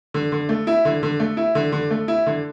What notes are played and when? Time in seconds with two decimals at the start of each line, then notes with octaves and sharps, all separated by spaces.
0.14 D3
0.32 D3
0.49 A3
0.67 E4
0.85 D3
1.03 D3
1.20 A3
1.37 E4
1.55 D3
1.72 D3
1.91 A3
2.08 E4
2.26 D3